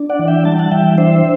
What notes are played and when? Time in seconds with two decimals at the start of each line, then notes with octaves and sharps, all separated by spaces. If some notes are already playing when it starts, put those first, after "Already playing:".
Already playing: D4
0.09 D5 F#5
0.19 E3
0.28 E5 G5
0.45 G3 A5
0.52 G5
0.59 F#5 A5
0.71 E3 E5 G5
0.98 D4 C5 E5